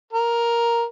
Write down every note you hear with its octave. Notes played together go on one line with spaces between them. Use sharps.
A#4